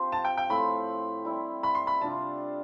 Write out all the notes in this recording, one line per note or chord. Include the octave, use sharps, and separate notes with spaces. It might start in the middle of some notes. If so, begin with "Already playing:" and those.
Already playing: F3 C4 G4 C5
A5
G5
G5
A2 F3 C4 B5
G3 C4 E4
B5
C6
B5
C3 G3 D4 F4 A5